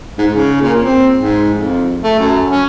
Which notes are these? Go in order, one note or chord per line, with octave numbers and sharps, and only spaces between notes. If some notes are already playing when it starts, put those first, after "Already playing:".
G#2
C#3
A#2
C4
G#2
F2
A3
F#2
C#4